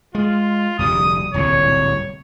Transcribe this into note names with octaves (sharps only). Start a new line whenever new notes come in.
G#3 F4
F1 D2 G3 D#6
D1 C2 A#2 C#5